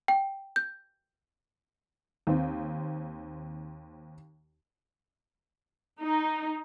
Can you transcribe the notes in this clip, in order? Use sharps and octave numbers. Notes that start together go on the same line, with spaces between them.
G5
G6
D#2 C4
D#4